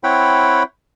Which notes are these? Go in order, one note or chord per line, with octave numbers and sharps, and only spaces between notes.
C4 E4 C#5 F#5 G5 B5